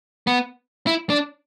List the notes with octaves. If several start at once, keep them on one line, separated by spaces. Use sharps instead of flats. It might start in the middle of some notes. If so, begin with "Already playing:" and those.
B3
E4
D4